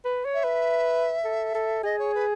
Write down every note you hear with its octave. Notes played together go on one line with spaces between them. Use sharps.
B4
C#5
E5
B4
A4
A4
G#4 D#5
C#5
B4